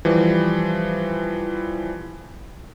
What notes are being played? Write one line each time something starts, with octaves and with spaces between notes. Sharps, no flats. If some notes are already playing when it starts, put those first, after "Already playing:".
E3 F3 G3